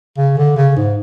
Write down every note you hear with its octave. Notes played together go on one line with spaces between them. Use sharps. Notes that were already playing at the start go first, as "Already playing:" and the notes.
C#3
D3
C#3
G#2